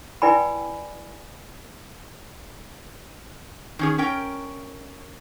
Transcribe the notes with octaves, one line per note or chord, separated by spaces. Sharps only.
E4 B4 D5 G5 G#5 B5
D#3 C#4 G#4
C#4 A#4 G5